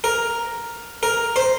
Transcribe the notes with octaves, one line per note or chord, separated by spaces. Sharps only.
A#4
A#4
C5